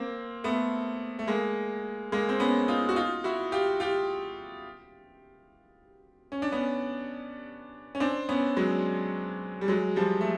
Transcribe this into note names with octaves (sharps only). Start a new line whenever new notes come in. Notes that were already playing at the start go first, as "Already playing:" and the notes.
Already playing: A#3 C4
A3 B3
A3
G#3 A#3
G#3 A#3
C4
B3 C#4
D#4 F4
F#4
D#4 F4
E4 F#4
F4 G4
F4 G4
C#4
D4
B3 C#4
C#4
C4 D4
B3 C#4
F#3 G#3
G3
F#3 G#3
F3 G3
A3